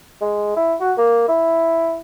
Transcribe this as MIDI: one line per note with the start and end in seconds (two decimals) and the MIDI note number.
0.21 0.54 56
0.57 0.75 64
0.81 0.92 66
0.97 1.24 58
1.28 2.00 64